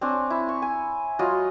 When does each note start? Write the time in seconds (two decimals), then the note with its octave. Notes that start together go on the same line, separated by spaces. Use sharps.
0.01 C4 D4 C#5 G#5
0.30 E4
0.49 C#6
0.62 G#5
1.19 F#3 F4 D#5